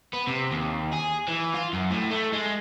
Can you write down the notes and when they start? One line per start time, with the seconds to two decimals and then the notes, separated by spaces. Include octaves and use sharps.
0.13 B3
0.27 C3
0.52 D#2
0.93 G#4
1.28 E3
1.54 F4
1.73 F#2
1.91 A2
2.11 A3
2.33 G#3